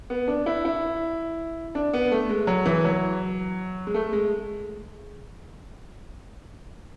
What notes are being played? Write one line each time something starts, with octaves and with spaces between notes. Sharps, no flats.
B3
D4
E4
E4
D4
B3
A3
G#3
F#3
E3
F#3
G#3
A3
G#3